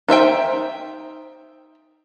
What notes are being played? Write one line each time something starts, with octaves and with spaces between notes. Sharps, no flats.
D#4 C5 E5 G5